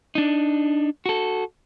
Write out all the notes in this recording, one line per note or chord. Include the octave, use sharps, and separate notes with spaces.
D4 D#4
F#4 A4